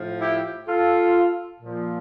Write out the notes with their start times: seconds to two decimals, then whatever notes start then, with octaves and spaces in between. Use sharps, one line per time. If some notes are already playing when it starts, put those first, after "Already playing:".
Already playing: A2 F3
0.21 E4 G4
0.67 F4 A4
1.60 A#2 F3